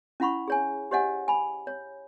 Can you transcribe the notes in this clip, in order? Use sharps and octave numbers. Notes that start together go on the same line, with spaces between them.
C#4 E4 F#5 B5 C#6
G#4 C#5 G#5
G4 C5 C#5 D#5 F#5 G#5
G#5 B5
C#5